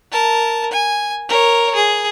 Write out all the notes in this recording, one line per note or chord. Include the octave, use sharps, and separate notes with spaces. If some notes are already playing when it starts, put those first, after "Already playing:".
A#4 A5
G#5
A#4 C#5
G#4